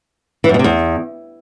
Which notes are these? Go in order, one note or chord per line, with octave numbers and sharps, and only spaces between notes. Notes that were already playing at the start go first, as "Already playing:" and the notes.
E3
F#2
B2
C3
E2